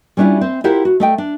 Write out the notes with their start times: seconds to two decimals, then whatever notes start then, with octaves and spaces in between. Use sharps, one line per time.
0.17 G3 C#4 D4 E4 F4
0.41 C4 C5
0.64 E4 F4 G4 A#4 C5 F#5
0.85 F#4
1.00 A3 D#5 G5
1.18 D4